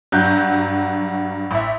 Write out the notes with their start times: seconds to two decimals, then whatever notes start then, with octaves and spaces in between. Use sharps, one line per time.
0.12 G2 F#3 F#6 G6
1.51 A1 E5